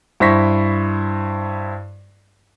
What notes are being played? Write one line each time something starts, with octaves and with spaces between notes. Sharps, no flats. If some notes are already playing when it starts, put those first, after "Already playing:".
G2 E4 C5 C#6 A#6 B6